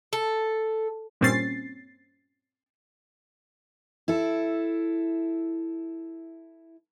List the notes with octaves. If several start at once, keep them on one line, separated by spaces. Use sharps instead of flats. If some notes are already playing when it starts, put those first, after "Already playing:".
A4
G2 A#2 C4 C#4 A6 C7
E4 A4